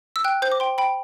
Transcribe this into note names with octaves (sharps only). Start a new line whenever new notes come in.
E6
G5 F#6
C5 G6
D6
G5 C6
G5 B5